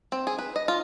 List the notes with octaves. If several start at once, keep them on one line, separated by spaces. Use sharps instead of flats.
C4
G#4
B4
D#5
F4